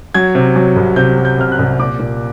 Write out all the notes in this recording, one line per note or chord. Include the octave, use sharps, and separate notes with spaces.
F#3 G#6
C3
F#3
C2
C3 G6
F#3
G6
C3 F6
F#6
C2
A#2 D6
A#2